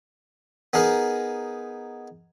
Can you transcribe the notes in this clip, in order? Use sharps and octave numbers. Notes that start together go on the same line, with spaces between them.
B3 D#4 G#4 A#4 D#5